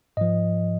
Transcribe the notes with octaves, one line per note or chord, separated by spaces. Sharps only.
G#2 F3 D#5